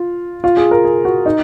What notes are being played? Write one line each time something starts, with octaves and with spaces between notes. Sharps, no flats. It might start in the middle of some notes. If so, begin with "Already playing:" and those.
Already playing: F4
F4
G#4
A#4
G#4
F#4
D#4